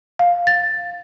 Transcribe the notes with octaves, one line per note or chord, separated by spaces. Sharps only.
F5
A6